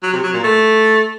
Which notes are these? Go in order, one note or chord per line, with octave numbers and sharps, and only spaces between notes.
F#3
C3
F#3
A#2
A3